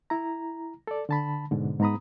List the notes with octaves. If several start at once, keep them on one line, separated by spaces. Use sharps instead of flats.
E4 A#5
A4 D5
D3 A5 B5
G#2 B2 D3
G#2 B3 A#5 B5 D#6